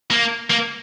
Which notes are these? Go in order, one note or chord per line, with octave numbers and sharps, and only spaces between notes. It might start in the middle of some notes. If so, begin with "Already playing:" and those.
A#3
A#3